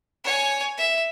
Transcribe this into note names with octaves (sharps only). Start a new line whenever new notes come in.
C#5 G#5
E5